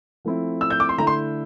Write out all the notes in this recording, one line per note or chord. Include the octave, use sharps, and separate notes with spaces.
F3 A3 C4 E4
E6
G6
D6
C6
D3 A3 E4 A#5
C6